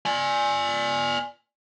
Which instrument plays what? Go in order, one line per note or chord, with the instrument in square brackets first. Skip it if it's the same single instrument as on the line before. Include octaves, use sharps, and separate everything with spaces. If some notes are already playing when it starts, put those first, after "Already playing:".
[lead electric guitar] D5 G#5